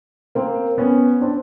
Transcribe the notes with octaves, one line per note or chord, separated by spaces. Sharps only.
A#3 C4
B3 C#4
C4 D4